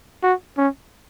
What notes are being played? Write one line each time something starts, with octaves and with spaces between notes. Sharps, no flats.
F#4
C#4